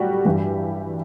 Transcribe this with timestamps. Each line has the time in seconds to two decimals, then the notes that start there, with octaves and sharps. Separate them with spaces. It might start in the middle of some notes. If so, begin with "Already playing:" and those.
Already playing: A2 F#3 G3 F#4 G4
0.25 G2 E3 G3